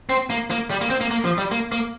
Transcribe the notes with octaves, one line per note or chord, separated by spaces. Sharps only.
C4
A#3
A#3
G3
A#3
C4
A#3
A#3
F3
G3
A#3
A#3